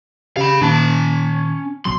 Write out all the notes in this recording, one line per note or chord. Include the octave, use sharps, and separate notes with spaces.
C#3 G4 F5 B5
A#2 D#3 C#4 A5
A#1 B2 F#3 C6